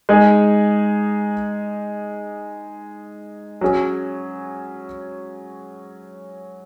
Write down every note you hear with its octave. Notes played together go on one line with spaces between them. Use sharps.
G#3 D#4 G#4
F#3 C#4 G#4